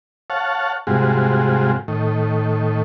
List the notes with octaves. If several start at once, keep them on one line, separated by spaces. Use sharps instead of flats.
C#5 F5 F#5 A5
G#2 C3 G3 G#3 F4 F#4
A2 D#3